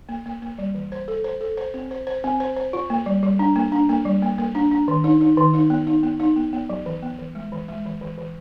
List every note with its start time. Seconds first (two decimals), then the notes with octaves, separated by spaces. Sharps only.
0.09 A#3
0.26 A#3
0.42 A#3
0.58 G3
0.75 E3
0.92 C5
1.08 A4
1.24 C5
1.41 A4
1.57 C5
1.74 C4
1.91 C5
2.07 C5
2.24 C4
2.40 C5
2.57 C5
2.73 F4
2.90 A#3
3.06 G3
3.23 G3
3.39 D4
3.56 A#3
3.72 D4
3.89 A#3
4.05 G3
4.22 A#3
4.38 A#3
4.55 D4
4.71 D4
4.88 D#3
5.04 D#4
5.21 D#4
5.38 D#3
5.54 D#4
5.70 B3
5.87 D#4
6.03 B3
6.20 D#4
6.36 B3
6.53 B3
6.69 F#3
6.86 E3
7.03 B3
7.19 E3
7.35 G#3
7.52 E3
7.68 G#3
7.85 E3
8.01 E3
8.18 E3